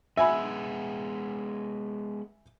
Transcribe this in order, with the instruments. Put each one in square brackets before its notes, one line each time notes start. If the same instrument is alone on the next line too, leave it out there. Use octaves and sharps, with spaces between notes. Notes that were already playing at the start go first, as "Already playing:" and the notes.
[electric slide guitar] G#3 B3 F#5 [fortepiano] E5 G#5 B5